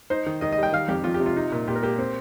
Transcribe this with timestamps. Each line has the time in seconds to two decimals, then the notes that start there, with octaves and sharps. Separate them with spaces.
0.10 D#4 C5
0.26 D#3
0.41 D#3 D#5
0.52 D#5
0.58 G3 G5
0.72 D#3 F5
0.88 F2 G4
1.04 F2 F4
1.14 G4
1.20 C3
1.26 F4
1.36 D#4
1.52 A#2
1.68 A#2 G4
1.75 A#4
1.83 A#3 G4
1.99 C4